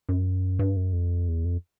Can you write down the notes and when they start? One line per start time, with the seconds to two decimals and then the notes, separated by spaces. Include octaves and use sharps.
0.09 F#2
0.59 G2
0.76 F#2
0.93 F2
1.28 E2
1.45 F2